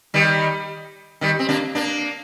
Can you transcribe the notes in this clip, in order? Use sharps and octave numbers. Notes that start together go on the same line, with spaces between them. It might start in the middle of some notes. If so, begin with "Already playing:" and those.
D#3 G3
D#3 G3
C4
A#3 D4
A#3 D4